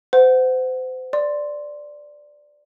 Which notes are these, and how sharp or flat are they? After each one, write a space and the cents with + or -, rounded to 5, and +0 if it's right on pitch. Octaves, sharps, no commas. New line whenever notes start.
C5 -35 F#5 +0
D5 +0 C6 +0